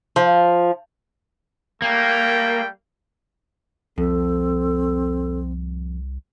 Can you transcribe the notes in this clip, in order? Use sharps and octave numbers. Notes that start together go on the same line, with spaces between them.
F3
G3 A3 A#3 G5
C2 F2 C4 A4